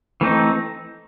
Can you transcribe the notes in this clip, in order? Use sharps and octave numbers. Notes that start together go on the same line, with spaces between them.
E3 A3 C4 D#4